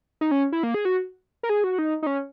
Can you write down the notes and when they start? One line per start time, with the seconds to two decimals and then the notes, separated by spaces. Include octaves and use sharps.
0.21 D#4
0.31 C#4
0.52 E4
0.63 A#3
0.74 G#4
0.85 F#4
1.43 A#4
1.49 G#4
1.64 F#4
1.78 D#4
2.03 D#4
2.07 C#4